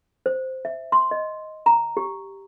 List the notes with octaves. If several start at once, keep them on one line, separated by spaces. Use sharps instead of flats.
C5
E5
C6
D#5
A#5
G4